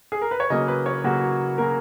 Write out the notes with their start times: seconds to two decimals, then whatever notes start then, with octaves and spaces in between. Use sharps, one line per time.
0.12 G#4
0.21 A#4
0.31 B4
0.40 C#5
0.50 C#3 F#3 A#3 D#5
0.68 B4
0.86 C#5
1.04 C#3 F#3 A#3 F#4
1.58 C#3 F#3 A#3 A#4